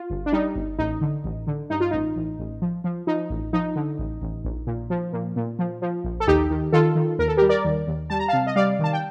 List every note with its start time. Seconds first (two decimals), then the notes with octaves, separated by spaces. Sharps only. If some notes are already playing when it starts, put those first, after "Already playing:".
Already playing: F4
0.10 G1
0.26 D4
0.32 G3 D#4
0.56 G1
0.78 A1 D#4
1.01 D3
1.24 A1
1.47 D3
1.70 G2 D#4
1.80 F4
1.91 A1 D#4
2.16 A1
2.39 A1
2.62 F3
2.84 F3
3.07 F3 D#4
3.30 A1
3.53 F3 D#4
3.76 D3
3.99 A1
4.22 A1
4.44 A#1
4.67 A#2
4.90 F3
5.13 A#2
5.36 A#2
5.59 F3
5.82 F3
6.04 A#1
6.20 A4
6.27 D#2 D#4 G4
6.50 D#3
6.73 D#3 F4 A4
6.95 D#3
7.19 D#2 A#4
7.28 A4
7.37 G3 G4 A#4
7.49 A#4 D5
7.65 D#2
7.87 D#2
8.10 G3 A5
8.19 A#5
8.28 C3 F5 A5
8.47 D#5
8.56 G3 D5 F5
8.79 D#3 A5
8.93 G5